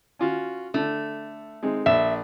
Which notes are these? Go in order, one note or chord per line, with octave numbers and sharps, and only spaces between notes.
C#4 F4 F#4
D3 A3
G#3 C4 D#4
A#1 E5